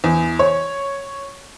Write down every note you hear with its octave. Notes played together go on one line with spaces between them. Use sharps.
E2
C#5